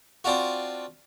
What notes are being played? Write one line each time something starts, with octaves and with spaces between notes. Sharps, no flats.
C4 D4 F4 F#4